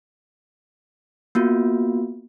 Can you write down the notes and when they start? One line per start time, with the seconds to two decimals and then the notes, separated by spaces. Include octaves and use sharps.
1.35 A#3 B3 F4 F#4